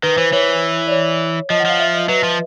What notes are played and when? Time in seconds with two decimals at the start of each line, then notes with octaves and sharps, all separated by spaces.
0.03 D#3 B4
0.18 E3 C5
0.33 E3 C#5
0.87 D5
0.91 C#5
1.50 F3 D#5
1.60 F#5
1.65 F3 F5
1.80 E5
1.94 D#5
2.09 F#3 B4
2.23 F3